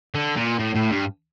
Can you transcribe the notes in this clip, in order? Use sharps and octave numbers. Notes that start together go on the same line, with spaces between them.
D3
A#2
A2
A2
G2